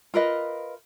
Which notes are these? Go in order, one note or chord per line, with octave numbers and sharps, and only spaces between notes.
F4 A#4 B4 D#5